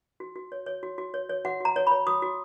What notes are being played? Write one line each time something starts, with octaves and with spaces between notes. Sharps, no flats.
F#4
F#4
C#5
C#5
F#4
F#4
C#5
C#5
F#4 F#5
F#4 A#5
C#5
C#5 B5
F#4 D#6
F#4